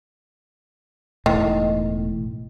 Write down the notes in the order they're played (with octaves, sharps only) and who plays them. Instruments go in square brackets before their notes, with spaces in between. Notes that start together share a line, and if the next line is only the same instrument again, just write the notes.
[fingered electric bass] E1 A2 [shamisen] D#3